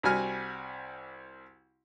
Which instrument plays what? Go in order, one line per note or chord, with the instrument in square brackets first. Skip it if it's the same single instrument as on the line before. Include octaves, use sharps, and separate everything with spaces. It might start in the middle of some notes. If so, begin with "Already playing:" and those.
[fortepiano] C2 G3 F#4 G#5 F6